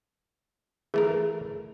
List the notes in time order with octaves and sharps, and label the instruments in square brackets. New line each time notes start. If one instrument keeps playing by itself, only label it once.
[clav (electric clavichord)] E3 A3 A#4 [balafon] G#4